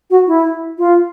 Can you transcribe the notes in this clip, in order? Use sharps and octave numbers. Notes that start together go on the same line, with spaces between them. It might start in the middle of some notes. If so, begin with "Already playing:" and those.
F#4
E4
F4